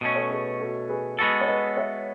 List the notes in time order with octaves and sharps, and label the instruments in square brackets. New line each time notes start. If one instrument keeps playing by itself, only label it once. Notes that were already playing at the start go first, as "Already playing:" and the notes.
[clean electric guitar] B2 A3 C#4 [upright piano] B4 D#5
[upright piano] A4 C#5
G#4 B4
F#4 A4
G#4 B4
[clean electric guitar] G#3 B3 F#4 A4
[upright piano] C#5
B4 D#5
C#5 E5